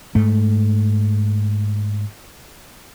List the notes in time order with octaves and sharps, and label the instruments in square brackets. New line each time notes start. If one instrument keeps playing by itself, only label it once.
[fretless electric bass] G#2 A3